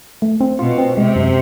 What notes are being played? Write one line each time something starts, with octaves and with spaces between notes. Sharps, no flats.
A3
C4
B2 F4
C4
C3 G#3
F#2